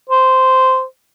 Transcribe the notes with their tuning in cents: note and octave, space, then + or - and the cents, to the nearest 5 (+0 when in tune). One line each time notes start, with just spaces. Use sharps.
C5 -10